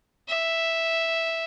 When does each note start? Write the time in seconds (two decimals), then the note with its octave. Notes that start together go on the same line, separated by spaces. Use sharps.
0.28 E5